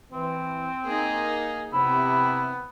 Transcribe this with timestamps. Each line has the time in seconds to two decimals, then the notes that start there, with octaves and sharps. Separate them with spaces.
0.12 E3 C4
0.85 A#3 D#4 G#4
1.73 C3 B3 E4